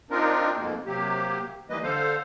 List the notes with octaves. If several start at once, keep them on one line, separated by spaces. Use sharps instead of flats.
C4 D4 D#4 F4 A#4
F2 G#2 B2 A#3
C3 F#3 A#3 G4
D#3 E3 G3 A#3 B4 D#5
D3 A4 C5 F5